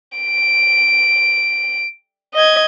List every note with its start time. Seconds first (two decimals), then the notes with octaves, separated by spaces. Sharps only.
0.18 D7
2.34 D#5 G#6